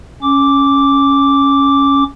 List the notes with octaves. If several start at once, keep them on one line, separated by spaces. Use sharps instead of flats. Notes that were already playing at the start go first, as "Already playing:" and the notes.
C#4 D6